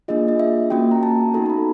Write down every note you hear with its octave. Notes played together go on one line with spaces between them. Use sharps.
A#3 D4 F4 G#4 D#5
D#5
E5
A#3 C#4 F#4 G5
A#5
A5
B3 D#4 F#4 A4 A5
A#5
B5